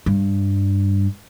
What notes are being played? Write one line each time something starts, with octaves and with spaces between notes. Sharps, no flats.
G2